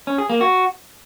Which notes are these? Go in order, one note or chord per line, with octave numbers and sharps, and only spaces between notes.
C#4
G#4
A#3
F#4